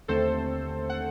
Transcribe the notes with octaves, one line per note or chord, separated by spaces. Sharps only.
D#2 D3 A3 C4 A4 C5
F#5